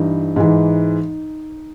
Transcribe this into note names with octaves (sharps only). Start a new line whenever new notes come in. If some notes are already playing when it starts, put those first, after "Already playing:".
Already playing: G2 E3 D#4
G#2 E3